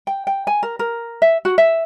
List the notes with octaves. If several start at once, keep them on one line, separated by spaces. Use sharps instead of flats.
G5
G5
G#5
A#4
A#4
E5
F#4
E5